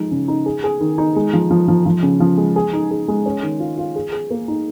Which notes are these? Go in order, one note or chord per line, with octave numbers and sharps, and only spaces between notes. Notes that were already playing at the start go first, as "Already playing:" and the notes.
Already playing: F3 G#3 D#4
C#3
D#4
G#4
G#4
D#3
D#4
G#3
F3
F3
F3
F3
C#3
F3
G#3
G#4
D#4
G#4
G#3
C#4
D#3
F4
F4
G#4
G#4
A#3
D#4